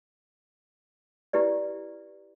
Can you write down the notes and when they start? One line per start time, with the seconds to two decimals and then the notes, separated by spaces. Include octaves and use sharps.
1.33 E4 G4 B4 D5